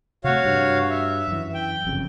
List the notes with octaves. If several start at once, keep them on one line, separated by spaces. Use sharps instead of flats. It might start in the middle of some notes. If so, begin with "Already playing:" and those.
C3 A3 F#4 C#5 F5
G2
E5
F#2 E3
G5
G1 F2 C#3